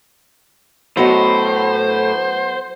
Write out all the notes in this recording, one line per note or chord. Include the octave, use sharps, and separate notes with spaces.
A2 F#3 B3 C5 D#5